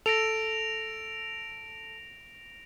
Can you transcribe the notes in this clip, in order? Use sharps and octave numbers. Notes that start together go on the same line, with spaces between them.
A4 A#6 D7 F7